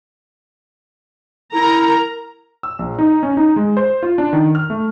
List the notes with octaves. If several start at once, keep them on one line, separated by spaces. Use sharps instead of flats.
E4 A#4 A#5
E6
A#1
D#4
C#4
D#4
G#3
C5
F4
D4
D#3
F6
A3